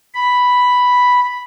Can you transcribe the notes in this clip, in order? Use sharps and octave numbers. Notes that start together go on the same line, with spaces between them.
B5